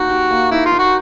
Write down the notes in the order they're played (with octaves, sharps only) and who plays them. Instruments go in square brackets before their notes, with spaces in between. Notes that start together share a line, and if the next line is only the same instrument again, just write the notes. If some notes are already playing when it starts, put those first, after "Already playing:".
Already playing: [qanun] A#3 D#4 [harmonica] F#4
[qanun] G4
A#3
[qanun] D#4 [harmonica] E4
[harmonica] F4
[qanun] D#4
[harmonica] F#4